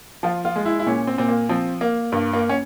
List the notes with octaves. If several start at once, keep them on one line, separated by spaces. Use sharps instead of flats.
F3 F4
F4
G#3
E4
E4
A#2 C#4
C4
A#2 C4
A#3
F3 C4
A#3
G2 A#3
A#3
C#4